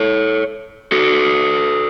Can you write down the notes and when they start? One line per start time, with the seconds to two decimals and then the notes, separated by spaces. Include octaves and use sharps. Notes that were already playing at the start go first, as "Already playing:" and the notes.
Already playing: A4 C#5
0.92 F#4 A4